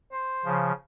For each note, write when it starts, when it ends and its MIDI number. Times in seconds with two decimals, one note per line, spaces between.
0.12 0.64 72
0.45 0.72 49
0.45 0.72 53